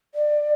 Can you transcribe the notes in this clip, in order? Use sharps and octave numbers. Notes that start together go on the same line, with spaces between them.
D5